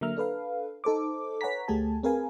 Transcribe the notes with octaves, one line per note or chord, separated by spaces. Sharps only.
D3 F#3 A#3 E5 A#5 F6
D4 A4 B4 F5
D#4 A4 C5 D6
B4 C#5 F#5 G#5 A#5 B6
D2 A3 G4 G#4 G#5 A5
C4 G#4 A#4 B4 F5 G#5